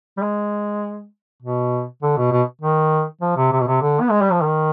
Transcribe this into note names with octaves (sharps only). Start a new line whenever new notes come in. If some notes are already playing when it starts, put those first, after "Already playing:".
G3
G#3
B2
D3
B2
B2
D#3
F3
C3
C3
B2
C3
D3
B3
G#3
G3
F3
D#3